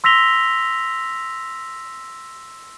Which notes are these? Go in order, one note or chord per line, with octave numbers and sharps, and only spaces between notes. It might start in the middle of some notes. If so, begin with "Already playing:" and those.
C6 E6 A#6 B6 F7 G7